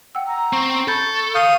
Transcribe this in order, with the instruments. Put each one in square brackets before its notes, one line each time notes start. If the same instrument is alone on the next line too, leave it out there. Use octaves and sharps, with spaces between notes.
[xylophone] F#5 G5 E6
[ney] A#5
[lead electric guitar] C4 [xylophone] C#6
[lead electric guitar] A4 [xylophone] B5 G6 A6 [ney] C#6
[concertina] F5 D#6 [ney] C#6 [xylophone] G6 C#7